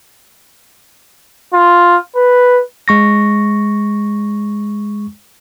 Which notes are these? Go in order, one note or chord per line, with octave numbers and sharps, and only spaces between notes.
F4
B4
G#3 C#6 A#6